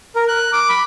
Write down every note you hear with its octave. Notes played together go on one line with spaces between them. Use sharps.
A#4
F#6
D6
B5